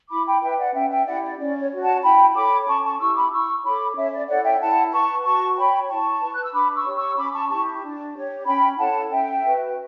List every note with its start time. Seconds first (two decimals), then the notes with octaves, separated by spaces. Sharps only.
0.10 E4 B5 D6
0.26 G5 B5
0.42 B4 E5 G5
0.59 D5 F#5
0.74 C#4 E5 G5
0.91 E5 G5
1.07 E4 G4 D5 F#5
1.23 D5
1.39 C#4 D5
1.60 C#5
1.71 F#4 C#5
1.82 F#5 A5
2.03 E4 G5 B5
2.35 A4 C#5 B5 D6
2.67 C#4 A5 C#6
2.84 A5 C#6
3.00 E4 G4 C#6 E6
3.16 B5 D6
3.32 E4 C#6 E6
3.64 A4 C#5 B5 D6
3.96 C#4 C#5 E5
4.12 D5
4.28 E4 A4 C#5 D5 F#5
4.44 E5 G5
4.60 E4 F#5 A5
4.93 B4 A5 C#6
5.24 F#4 A5 C#6
5.57 C#5 G5 B5
5.89 E4 A5 C#6
6.21 B4
6.33 F#6
6.43 E6
6.53 D4 B5 D6
6.75 C#6 E6
6.85 G4 C#5
6.96 C#6 E6
7.17 C#4 B5 D6
7.34 A5 C#6
7.50 E4 G4 A5 C#6
7.82 D4
8.14 G4 C#5
8.46 C#4 G5 B5
8.78 E4 A4 C#5 F#5 A5
9.10 C#4 E5 G5
9.43 F#4 B4